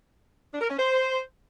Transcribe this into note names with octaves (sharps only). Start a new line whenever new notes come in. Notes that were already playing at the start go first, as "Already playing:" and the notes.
D4
A#4
C#4
C5